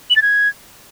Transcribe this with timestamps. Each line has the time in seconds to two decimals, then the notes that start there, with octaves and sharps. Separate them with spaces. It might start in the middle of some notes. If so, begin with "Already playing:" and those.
0.10 F#7
0.16 A6
0.22 G#6